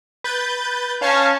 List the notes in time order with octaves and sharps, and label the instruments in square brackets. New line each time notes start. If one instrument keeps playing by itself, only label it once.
[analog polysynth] B4 G6 A6
[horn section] C#4 [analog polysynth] F5 A5 C#6